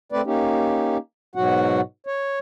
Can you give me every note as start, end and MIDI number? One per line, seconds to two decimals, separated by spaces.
0.12 0.21 57
0.12 0.21 60
0.12 0.21 71
0.12 0.21 74
0.26 0.97 58
0.26 0.97 61
0.26 0.97 63
0.26 0.97 67
1.35 1.81 44
1.35 1.81 47
1.35 1.81 54
1.35 1.81 66
1.35 1.81 78
2.07 2.39 73